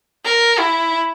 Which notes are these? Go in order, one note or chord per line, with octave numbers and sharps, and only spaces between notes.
A#4
E4